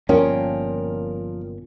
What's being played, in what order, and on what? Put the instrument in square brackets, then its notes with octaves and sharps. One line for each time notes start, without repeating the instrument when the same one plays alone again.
[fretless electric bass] G1 A#2 C#4 [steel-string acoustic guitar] F3 A#4 G5